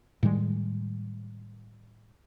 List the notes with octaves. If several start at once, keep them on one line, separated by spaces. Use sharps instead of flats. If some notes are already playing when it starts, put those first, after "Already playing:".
A2 D#3 G3 G#3